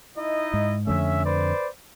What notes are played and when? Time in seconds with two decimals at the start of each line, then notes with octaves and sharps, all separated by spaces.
0.18 D#4 E4 D#5
0.54 G#2
0.87 F2 D3 A3 C#4 E5
1.25 B4 C5 D5